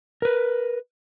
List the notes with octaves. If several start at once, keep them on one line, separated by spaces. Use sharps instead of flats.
A#4 B4